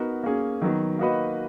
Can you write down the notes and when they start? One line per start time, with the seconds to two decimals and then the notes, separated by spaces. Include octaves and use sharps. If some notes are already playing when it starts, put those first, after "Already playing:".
Already playing: B3 D#4 F#4 A#4
0.23 A#3 C#4 G#4
0.62 D#3 F#3 B3
0.99 A#3 D#4 F#4 B4 D#5